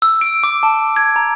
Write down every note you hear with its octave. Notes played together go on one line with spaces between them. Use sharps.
E6
D7
D6
A5
G#6
A#5